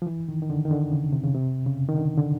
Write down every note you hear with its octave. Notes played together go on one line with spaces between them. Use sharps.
F3
E3
D#3
D#3
D3
D#3
D3
C#3
C3
C#3
C3
C#3
D#3
D3
D3